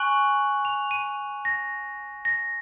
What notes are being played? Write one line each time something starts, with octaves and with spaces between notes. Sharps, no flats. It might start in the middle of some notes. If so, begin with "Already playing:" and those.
Already playing: G#5 C#6 F#6 F#7
F7
D#7
A#6
A#6